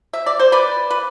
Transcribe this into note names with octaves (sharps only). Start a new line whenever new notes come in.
E5
D5
C5
B4 D5
B4